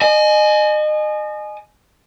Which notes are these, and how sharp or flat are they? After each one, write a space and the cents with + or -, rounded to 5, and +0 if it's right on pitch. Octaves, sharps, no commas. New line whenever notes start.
D#5 -30 G#5 +25